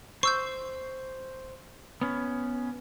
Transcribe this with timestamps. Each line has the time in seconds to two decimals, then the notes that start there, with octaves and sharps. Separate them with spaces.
0.23 C5 C#6 E6 G6
2.01 B3 C#4